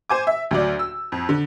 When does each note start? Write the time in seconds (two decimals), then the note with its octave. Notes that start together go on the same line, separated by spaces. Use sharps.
0.10 C5 G#5 D6
0.27 E5
0.51 D2 F#3 D5
0.79 E6
1.12 F2
1.29 D3